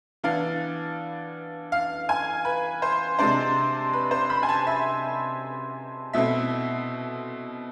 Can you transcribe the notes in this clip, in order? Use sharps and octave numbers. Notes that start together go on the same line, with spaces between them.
E3 B3 D4 F5
F5
G#5
B4
C5
C3 G#3 D4 C5
B4
C5
B5
G#5
A5
E5
B2 A3 C4 E4 E5